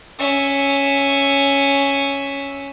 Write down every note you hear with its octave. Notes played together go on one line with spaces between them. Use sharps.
C#4 E5